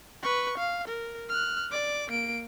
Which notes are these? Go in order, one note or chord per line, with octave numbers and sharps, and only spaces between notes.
B4 C#6
F5
A#4
F6 F#6
D5 D6
A#3 D7